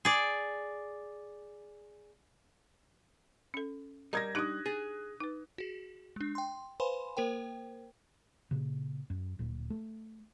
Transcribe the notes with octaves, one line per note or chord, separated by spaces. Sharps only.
G#4 D5
C#4 A4
G3 A#4 D#5 A#5 D#6 G#6 A#6
D4 D#4 G4 D#6 F#6
G#4 A6
D#4 B4
F#4 G#4
G#3 D4
G5 C6
B4 C5 F5 G#5 B5 C6
A#3 A#4 C5 G5
A#2 C#3
F#2
D1 A#2
A3